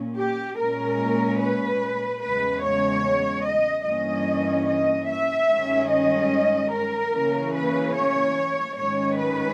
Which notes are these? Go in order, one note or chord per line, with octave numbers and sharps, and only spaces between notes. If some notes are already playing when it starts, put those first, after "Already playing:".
Already playing: A#2 A#3 C#4
G4
A#2 G#3 C#4 A#4
B4
E2 C#3 G#3 B4
C#5
D#5
G2 E3 A#3 C#4 D#5
D#5
E5
G2 D#3 G#3 C#4
D#5
A#4
C#3 E3 A#3 C#4
B4
C#5
G#2 D#3 G#3 C#4 C#5
B4